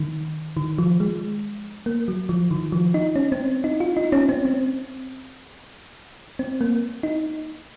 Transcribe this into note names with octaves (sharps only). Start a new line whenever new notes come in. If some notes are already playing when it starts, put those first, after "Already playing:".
Already playing: D#3
D#3
F3
G#3
A#3
F#3
F3
D#3
F3
D#4
C#4
C4
D#4
F4
D#4
C#4
C4
C4
C4
A#3
D#4